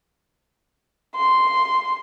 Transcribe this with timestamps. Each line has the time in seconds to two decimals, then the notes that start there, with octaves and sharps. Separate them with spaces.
1.16 C6